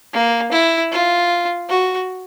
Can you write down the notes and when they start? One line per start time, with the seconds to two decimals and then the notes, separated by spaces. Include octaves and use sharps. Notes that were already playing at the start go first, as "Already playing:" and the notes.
0.13 A#3
0.52 E4
0.92 F4
1.69 F#4